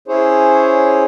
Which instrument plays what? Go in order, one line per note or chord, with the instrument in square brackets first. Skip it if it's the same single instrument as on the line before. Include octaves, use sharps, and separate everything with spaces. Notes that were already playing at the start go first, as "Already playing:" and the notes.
[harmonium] C#4 E4 G#4 C5 C#5